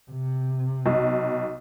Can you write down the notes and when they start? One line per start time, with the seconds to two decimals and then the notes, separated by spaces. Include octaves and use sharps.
0.11 C3
0.86 B1